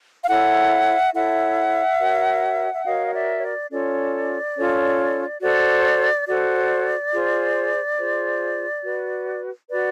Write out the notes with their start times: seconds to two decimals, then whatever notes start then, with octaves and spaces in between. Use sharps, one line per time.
0.23 F5
0.28 E4 A4 C#5 E5 F#5
1.14 E4 A4 C#5 E5 F#5
1.99 F#4 A#4 C#5
2.73 E5
2.85 F#4 A#4 C#5 D#5 F5
3.06 D#5
3.13 D5 E5
3.37 C#5
3.43 D5
3.70 C#4 F4 A4 C#5 D5
4.57 C#4 F4 A4 C#5
5.41 F#4 A4 C5 D5
6.26 F#4 A4 C5 D5
7.12 F4 G#4 C5
7.98 F4 G#4 C5
8.83 F#4 B4
9.69 F#4 B4 D5